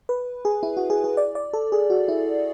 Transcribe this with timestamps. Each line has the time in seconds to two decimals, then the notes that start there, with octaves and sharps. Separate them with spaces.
0.09 B4
0.45 G#4
0.63 E4
0.77 F#4
0.90 G#4
1.04 G#4
1.17 D5
1.35 D5
1.53 A4
1.72 G#4
1.90 F#4
2.08 E4